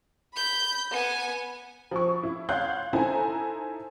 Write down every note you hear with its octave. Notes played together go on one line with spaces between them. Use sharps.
B5 G6
B3 G#5
F3 C#6
E4
C#5 F5 F#5 C6 F#6 G6
D#4 E4 A4 C5 G#5 A#5